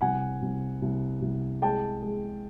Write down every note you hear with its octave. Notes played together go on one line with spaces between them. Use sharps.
C2 F#5 G#5
C2
C2
C2
G#3 G5 A5
G#3